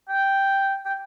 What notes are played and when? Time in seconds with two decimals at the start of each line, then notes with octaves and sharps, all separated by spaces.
0.09 G5
0.85 G5